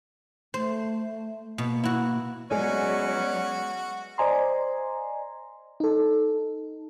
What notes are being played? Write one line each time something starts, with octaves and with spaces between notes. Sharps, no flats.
A3 C5
B2 A#3
E4 F#4
F#3 G#3 B3 C#4 F#4 G#4 D5 D#5
C5 D5 D#5 G#5 A#5 C6
D#4 A4